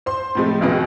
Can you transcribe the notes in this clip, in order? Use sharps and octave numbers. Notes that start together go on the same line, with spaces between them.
C5 C6
A2 C3 F3 G#3 A3
F1 C#2 D#3 B3 F#4 G#4